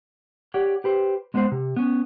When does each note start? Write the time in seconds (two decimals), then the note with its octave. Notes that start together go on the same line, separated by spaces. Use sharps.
0.54 G4 C#5 D5 F#5
0.84 G4 B4 C5
1.34 G#3 B3 D4 F#4 C5 F#5
1.52 C3
1.76 B3 C#4